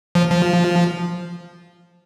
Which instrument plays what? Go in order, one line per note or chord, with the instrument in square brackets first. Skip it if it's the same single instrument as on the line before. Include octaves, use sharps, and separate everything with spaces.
[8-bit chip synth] F3
F3